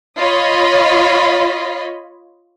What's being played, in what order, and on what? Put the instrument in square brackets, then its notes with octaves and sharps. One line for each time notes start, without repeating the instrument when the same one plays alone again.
[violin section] F4 C#5 D#5 B5